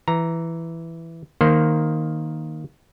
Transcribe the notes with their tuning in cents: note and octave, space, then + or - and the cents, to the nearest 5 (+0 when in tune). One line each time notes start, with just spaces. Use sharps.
E3 +5 A#5 +0
D#3 +0 A#3 +0 C5 +0